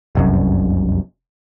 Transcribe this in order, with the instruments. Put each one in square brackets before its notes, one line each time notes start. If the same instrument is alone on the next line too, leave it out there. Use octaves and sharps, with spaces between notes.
[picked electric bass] F1 C2 F#2